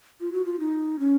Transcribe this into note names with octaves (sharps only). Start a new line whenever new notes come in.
F4
F#4
F4
D#4
C#4